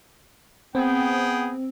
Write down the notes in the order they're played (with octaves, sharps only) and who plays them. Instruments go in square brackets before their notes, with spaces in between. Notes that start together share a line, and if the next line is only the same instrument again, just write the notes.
[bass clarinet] B3 [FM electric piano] C4 [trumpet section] G#4 G5